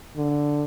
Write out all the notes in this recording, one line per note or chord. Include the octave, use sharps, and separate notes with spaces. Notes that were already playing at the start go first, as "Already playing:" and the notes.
D3